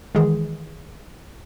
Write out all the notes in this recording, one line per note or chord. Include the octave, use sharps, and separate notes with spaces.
D#3 E3 G#3 G#4